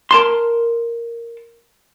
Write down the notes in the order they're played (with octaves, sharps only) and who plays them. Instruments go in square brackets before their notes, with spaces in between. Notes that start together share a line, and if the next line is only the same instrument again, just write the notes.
[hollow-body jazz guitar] A#4 A5 C6